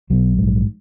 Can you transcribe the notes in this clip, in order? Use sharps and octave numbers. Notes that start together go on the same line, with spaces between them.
B1 B2 F#3
A#1 G#2